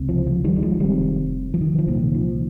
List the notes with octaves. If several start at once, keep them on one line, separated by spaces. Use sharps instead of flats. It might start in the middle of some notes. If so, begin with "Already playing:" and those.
Already playing: C#2 C3
F3
F3
D#3 G3
G3
F3 G#3
F1 F2 C3 D#3 G3
F3
D#3
F3
C2 A#2 D#3
F3